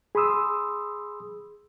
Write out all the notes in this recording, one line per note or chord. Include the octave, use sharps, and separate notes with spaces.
G#4 B5 C6 D#6 E6